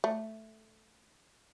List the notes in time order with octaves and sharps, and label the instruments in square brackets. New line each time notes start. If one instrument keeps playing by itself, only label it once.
[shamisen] A3